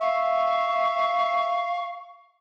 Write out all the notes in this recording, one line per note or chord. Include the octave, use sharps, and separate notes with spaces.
E5 F5 C#6